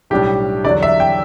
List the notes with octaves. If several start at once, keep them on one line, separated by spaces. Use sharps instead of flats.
B1 A2 G3 D4 G4
E2 D3 F#3 D5
E5
G5